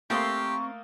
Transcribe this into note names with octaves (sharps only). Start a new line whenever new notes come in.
A3 A#3 C4 G4 A5 C6 C#6 D#6